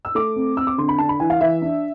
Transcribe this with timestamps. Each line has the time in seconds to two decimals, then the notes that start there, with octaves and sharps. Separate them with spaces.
0.05 E6
0.15 A3 D6
0.36 C4
0.57 C4 E6
0.67 D6
0.78 D3 C6
0.89 B5
0.98 D4 A5
1.09 B5
1.20 E3 G#5
1.30 F5
1.41 E3 E5
1.62 D4